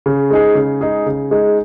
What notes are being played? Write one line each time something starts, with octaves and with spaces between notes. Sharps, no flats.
C#3
G#3 D#4 G#4
C#3
G#3 D#4 G#4
C#3
G#3 D#4 G#4